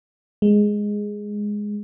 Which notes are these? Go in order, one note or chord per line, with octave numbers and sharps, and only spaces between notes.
G#3